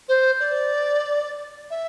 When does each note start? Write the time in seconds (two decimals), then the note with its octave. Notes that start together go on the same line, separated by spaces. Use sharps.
0.08 C5
0.40 D5
1.70 E5